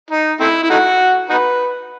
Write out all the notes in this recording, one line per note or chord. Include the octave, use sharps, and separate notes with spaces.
D#4
A3 C4 E4
E4
A3 D#4 F#4
D#4 F#4 B4